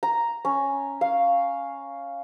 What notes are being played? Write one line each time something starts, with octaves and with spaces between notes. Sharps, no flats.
A#5
C#4
F5